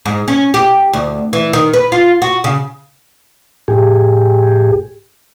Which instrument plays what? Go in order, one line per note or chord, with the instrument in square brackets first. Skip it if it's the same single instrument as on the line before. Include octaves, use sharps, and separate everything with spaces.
[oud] G#2
C#4
G4
D2
E3
D#3
B4
F4
F#4
C#3
[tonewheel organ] A2 G4 G#4